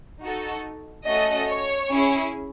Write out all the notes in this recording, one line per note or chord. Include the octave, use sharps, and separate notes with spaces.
D#4 F#4 A4
A3 C#4 F#4 A4 D#5
C#5
C#4 E4 G#4